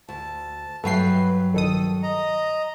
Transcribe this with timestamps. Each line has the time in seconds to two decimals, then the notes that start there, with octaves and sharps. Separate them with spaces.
0.09 D2 A5
0.84 G2 F#3 A3 B4 G5 C7
1.54 A#1 D#3 A4 D#6
2.03 D#5 A#5